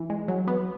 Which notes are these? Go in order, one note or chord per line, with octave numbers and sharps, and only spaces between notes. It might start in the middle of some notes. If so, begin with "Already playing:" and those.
Already playing: E3
G#3
F#3
B3